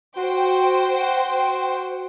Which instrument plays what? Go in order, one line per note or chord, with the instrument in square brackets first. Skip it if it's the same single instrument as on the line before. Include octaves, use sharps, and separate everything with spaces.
[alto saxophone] F#4 [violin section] C5 G5